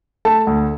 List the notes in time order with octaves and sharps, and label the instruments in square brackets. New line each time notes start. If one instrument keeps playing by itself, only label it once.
[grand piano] A3 A5
D2